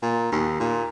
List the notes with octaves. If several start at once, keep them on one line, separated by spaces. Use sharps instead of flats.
A#2
D#2
A#2